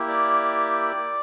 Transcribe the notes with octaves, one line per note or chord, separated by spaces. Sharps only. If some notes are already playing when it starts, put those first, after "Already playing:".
Already playing: A#3 E4 G4
D5